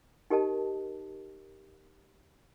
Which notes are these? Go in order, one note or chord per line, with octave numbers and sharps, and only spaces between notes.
D#4 G4 A#4 D#5 A5